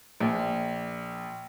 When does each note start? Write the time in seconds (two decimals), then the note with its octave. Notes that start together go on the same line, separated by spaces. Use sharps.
0.20 A#1